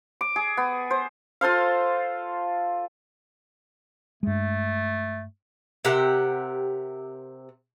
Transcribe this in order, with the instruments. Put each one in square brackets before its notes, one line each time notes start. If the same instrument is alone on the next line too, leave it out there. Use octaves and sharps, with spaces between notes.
[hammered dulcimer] D6
G#4
B3
C5
F4 A4 C5 F5
[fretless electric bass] G2 G#3 [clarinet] A3
[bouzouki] C3 G4 A#4 F#5